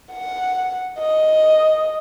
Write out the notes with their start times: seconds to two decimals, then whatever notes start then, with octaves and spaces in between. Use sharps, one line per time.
0.12 F#5
0.99 D#5